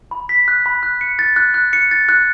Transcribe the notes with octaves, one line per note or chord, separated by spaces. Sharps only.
B5
B6
F#6
B5
F#6
C#7
A6
F#6
F#6
C#7
A6
F#6